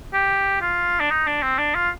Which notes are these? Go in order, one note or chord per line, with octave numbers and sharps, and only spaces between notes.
G4
F4
D4
D#4
D4
C4
D4
F4